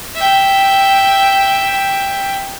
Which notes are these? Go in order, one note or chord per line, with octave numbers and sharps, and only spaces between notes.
E5 G5